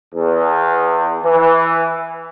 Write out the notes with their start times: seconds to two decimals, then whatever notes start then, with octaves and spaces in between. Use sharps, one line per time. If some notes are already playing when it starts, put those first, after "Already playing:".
0.15 E2
1.24 E3